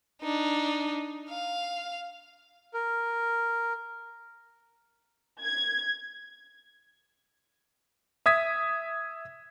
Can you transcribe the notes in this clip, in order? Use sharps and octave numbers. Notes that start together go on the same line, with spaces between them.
D4 D#4
F5
A#4
G#6
E5 D#6 G#6 B6